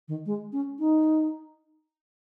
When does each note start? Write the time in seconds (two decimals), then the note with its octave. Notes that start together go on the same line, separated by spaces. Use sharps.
0.08 D#3
0.26 G#3
0.53 C#4
0.79 D#4